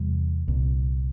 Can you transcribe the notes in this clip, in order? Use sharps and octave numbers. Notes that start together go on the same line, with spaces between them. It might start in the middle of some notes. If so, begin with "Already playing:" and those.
Already playing: E2 C3 G3
C2 A#2